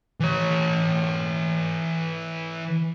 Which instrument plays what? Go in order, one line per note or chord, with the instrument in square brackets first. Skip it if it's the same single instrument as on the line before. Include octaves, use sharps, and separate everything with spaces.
[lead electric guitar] E3 C#5